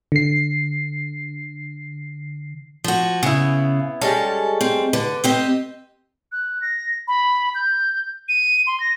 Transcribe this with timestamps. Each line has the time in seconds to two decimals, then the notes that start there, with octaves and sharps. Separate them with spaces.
0.12 D3 C7
2.84 F3 F#4
3.23 C#3 B3 E4
4.01 G3 G#3 C#4 A4
4.61 C4
4.93 D3 B4
5.24 C4 G4 D#5
6.32 F#6
6.62 A#6
7.08 B5
7.55 G6
8.28 D#7
8.67 C6
8.80 A#6